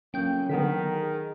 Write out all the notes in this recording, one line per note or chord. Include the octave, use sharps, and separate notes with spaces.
F2 C#3 F#3 A#3 C#4 G5 G6
D3 D#3 F#3 B3 A4 B6
G#4